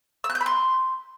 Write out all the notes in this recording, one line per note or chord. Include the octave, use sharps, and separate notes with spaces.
E6
F#6
G6
B5
C6